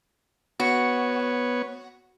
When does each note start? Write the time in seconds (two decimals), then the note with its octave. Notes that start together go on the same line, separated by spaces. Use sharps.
0.60 B3 F#4 C#5